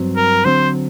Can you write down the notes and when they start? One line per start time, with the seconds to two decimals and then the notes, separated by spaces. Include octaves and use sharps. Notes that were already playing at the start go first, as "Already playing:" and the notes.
Already playing: G2 F#3 C4
0.16 A#4
0.45 D3 F#3 C4 C5